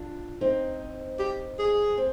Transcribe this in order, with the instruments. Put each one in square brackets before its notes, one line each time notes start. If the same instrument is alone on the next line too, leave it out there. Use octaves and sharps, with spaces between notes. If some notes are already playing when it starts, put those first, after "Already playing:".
Already playing: [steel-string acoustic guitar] D4 F4
C4 D#4
[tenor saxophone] G4
G#4
[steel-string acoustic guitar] C4